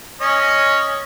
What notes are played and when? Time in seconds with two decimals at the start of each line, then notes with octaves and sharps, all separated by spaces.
0.21 C#4 C#5 D#5